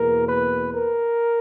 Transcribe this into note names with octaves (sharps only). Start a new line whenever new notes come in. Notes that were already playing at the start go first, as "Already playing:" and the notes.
Already playing: E2 B2 A#3 A#4
B4
A#4